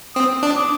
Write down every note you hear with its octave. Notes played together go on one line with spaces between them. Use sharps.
C4 D#6
D4
D6